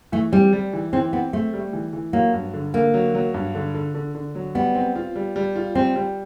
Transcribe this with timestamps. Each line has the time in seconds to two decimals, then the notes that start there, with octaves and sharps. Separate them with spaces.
0.12 E3 A3
0.32 G3 C4
0.53 G3
0.73 E3
0.93 E3 C4
1.13 B3 C4
1.33 A3 C4
1.53 G3
1.73 E3
1.93 E3
2.13 F#3 A#3
2.34 G2
2.54 D3
2.74 D3 A#3
2.94 F#3
3.15 F#3
3.34 G2
3.55 D3
3.74 D3
3.94 D3
4.15 D3
4.35 F#3
4.55 G3 B3
4.75 C4
4.96 F4
5.16 G3
5.36 G3
5.56 F4
5.75 G3 C4
5.96 G3